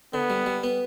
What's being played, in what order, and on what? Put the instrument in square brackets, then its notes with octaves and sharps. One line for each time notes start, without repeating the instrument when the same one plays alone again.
[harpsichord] D3 [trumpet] B3
[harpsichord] G3
G3
B3